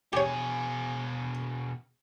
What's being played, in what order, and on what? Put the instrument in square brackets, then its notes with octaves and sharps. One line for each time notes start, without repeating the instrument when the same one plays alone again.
[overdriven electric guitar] B2 G#4 [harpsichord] G4 C#5